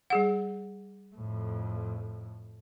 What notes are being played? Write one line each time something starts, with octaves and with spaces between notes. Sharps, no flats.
G3 G#4 F#5
F2 A2